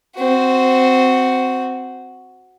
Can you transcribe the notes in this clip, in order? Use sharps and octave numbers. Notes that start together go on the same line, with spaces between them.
C4 F#4